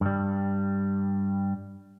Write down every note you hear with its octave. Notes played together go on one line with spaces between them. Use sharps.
G2 G3